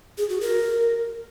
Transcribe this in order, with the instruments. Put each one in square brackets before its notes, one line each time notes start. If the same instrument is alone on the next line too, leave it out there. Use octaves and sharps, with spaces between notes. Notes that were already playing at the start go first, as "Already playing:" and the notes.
[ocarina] G#4
F#4
A#4